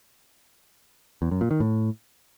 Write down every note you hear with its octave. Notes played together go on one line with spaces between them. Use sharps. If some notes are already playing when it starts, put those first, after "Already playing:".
E2
F#2
A#2
D#3
A2